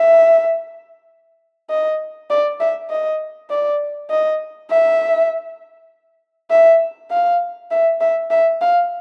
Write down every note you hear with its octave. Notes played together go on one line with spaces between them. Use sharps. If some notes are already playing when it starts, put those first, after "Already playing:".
Already playing: E5
D#5
D5
E5
D#5
D5
D#5
E5
E5
F5
E5
E5
E5
F5